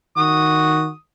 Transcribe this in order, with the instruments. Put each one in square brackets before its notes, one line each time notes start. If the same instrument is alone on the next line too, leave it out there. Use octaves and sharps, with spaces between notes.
[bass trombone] D#3 [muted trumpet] F#4 [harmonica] D#6